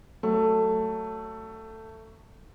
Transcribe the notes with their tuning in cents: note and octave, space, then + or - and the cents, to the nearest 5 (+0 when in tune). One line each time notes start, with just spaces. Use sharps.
F#3 +20 A3 +10